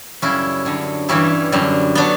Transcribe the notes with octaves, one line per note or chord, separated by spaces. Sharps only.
F#2 C#3 G3 C#4 E4
F#2 D3 G3
G2 E3 G3 C#4 E4
F#2 D3 G3
D3 F#3 B3 D4